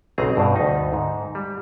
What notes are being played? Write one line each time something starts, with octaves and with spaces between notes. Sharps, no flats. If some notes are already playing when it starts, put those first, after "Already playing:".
B1 C#3 C4 G#4 A#5
G2 B2
D2 D#4
G#2
G3